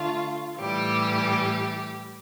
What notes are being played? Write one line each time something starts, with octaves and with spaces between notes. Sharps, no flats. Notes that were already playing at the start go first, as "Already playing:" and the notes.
Already playing: D3 A3 F4
A2 E3 G3 G4